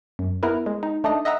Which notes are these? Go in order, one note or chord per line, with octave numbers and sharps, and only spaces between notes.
F#2
B3 E4 A#4 B4
G#3
D#4
A3 D4 D#4 D#5
D#5 E5 F#5 A#5 B5